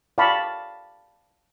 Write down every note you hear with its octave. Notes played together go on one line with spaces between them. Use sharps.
D5 F5 G5 A5 B5 C#6